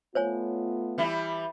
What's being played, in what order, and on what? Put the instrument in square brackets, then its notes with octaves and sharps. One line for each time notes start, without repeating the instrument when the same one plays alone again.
[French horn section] A3 B3 F4 [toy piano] C5 C#5 G#5
[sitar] E3 G3 E4